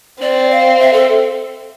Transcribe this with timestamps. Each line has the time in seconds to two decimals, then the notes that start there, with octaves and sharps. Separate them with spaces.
0.21 C4 D5
0.50 F5
0.79 E5
0.93 A4